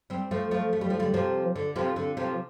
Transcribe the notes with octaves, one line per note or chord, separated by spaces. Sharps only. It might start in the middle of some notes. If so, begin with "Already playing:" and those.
G3 C4
F3 A3
F3 A3
A3
G3
F3
D3 G3
C3 F3
D3
C3 F3
D3
C3 F3